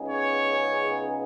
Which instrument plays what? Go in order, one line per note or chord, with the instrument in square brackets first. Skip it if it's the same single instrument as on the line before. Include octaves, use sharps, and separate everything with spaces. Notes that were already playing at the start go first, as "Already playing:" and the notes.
Already playing: [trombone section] C#2 C#3 B3 D#4 G#4
[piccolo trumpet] C#5